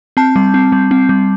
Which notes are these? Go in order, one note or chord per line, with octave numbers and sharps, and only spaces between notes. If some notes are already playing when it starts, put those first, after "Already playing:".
C4 A5
G3
C4
G3
C4
G3